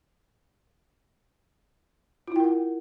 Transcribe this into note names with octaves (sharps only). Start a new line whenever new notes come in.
E4 F4 A#4 F#5 G5